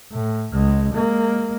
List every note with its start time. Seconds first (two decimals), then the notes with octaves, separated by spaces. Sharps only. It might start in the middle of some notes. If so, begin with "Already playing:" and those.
0.12 A2
0.53 C#2 G#3
0.94 G#3 A#3